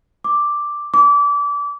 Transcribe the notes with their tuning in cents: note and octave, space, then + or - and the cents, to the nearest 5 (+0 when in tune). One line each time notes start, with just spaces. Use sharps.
D6 +0
D6 -30